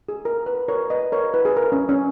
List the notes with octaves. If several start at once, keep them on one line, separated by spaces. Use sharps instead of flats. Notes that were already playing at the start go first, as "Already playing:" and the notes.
G#4
A#4
B4
A#4 C#5
B4 D#5
A#4 C#5
B4
G#4
A#4
C#4
C#4